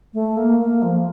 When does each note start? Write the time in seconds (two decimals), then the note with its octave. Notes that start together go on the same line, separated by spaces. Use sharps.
0.14 A3
0.37 A#3
0.60 A#3
0.82 F3